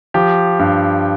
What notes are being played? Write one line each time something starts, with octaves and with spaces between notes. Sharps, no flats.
F3 G4
G2